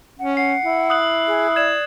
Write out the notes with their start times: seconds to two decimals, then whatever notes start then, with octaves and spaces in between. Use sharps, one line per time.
0.19 C#4 F#5
0.37 F#5 C7
0.64 E4
0.90 D#6 F#6 F#7
1.27 G#4
1.56 D5 G#6 E7